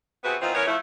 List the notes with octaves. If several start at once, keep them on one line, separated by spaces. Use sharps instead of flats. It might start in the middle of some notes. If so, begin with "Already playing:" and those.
C3 B3 C4 F#4 G#4 B4
D#3 E3 B3 C4 D#4 F4
E3 B3 C#4 A#4 C#5
F3 A3 E4